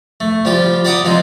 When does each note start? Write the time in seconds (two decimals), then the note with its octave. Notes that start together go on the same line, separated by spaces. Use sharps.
0.20 A3
0.45 F3 G3 F4 G4
0.85 G4 D5 F#5 A#5 D6 D#6
1.05 F3 G#3 C4 D#4